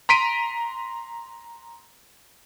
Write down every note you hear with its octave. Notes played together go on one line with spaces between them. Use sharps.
A#5 C6 B6 D7 D#7